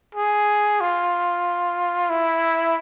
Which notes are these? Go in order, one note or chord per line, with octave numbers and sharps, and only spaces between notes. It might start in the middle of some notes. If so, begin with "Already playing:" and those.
G#4
F4
E4